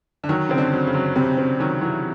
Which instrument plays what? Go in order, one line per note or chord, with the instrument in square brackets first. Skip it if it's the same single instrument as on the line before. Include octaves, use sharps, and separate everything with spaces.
[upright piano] D3
[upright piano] D#3 [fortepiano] F#3
[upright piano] C#3 [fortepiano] C4
[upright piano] D3
[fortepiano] F#3
[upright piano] C#3
[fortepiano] F#3
[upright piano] C3 [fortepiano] C4
[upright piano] C#3 [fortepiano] C4
[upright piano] D#3 [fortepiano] F#3
[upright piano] E3 [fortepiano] F#3